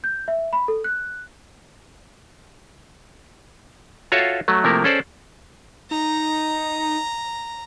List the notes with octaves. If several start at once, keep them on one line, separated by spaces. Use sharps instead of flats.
G6
E5
B5
A4
F#6
F4 F#4 A4 C#5 E5 F5
F#3 A3
C3 F3 A3 A#3 E4 A#4
C#4 G#4 A4 C5 D5
D#4 A#5